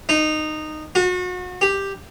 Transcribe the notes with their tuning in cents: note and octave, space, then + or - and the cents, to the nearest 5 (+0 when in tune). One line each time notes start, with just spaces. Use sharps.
D#4 -15
F#4 -35
G4 +5